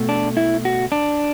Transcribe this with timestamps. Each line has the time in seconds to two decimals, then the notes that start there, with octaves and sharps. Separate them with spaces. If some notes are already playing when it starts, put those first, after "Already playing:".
Already playing: B2 A3
0.09 D4
0.37 E4
0.65 F#4
0.92 D4